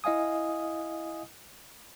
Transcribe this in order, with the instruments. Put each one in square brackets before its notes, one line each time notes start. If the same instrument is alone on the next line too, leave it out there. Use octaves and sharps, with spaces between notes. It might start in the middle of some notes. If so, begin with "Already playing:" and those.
[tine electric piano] E4 D#5 F5 G#5 D#6